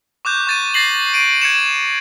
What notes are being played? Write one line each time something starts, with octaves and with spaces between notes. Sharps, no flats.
C#6 D6 F#6 G6
C#6 A6 D#7
A6 A#6 C7 F#7
D7 D#7
G#6 C#7 E7